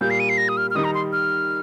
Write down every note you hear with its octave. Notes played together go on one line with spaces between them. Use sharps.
A#2 G3 A#3 G6
C7
D#7
C7
A#6
D#6
F6
F6
D#3 G3 D#4 D#6
A#5
C6
F6